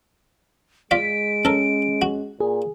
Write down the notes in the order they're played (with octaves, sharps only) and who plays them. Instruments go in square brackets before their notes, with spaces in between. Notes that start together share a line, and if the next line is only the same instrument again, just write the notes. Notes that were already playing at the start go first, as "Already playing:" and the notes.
[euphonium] G#3 [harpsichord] F4 D5 [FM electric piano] B6 [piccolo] D7
[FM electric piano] C#4 [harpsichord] A4 A#4
[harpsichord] F#4
[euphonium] A#2 [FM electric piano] G#4